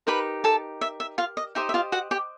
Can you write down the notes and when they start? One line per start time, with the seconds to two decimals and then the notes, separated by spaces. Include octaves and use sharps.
0.07 D#4 G4 A#4 B4 B5
0.44 A4 A5
0.81 E5
1.00 E5
1.18 F4 F5
1.37 D#5
1.55 D#4 G4 C5 D#5 E5
1.69 E5
1.74 F4 F5
1.92 F#4 F#5
2.11 G4 G5